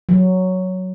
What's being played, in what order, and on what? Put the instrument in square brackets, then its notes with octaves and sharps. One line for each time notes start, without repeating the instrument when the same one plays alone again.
[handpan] F#3